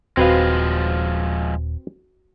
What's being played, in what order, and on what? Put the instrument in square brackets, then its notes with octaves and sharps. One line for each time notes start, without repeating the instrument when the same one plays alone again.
[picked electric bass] D#1 [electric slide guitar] F3 G#3 [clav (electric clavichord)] C4 B4 F5 [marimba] F#4